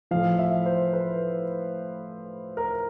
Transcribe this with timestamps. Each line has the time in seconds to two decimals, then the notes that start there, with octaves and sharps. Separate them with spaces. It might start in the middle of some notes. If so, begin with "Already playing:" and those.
0.11 F3 F5
0.15 A2
0.39 E5
0.66 C5
0.93 B4
2.57 A#4